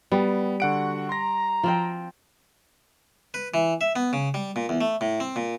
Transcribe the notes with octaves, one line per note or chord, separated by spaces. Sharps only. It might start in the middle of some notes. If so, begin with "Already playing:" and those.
G3 B3
D3 F#4 F#5 D7
A#5 C6 A#6
F3 C4 G5
B4
E3
E5
B3
C#3
G3
A#2
E2
A3
A2
C4
A#2